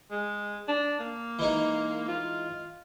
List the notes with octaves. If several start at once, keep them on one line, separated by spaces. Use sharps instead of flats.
G#3
D4
A#3
E3 G#3 D#4
F4